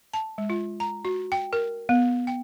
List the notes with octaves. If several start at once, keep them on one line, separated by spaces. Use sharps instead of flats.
A5
G#3
F4
A#5
F#4
G5
A#4
B3
G5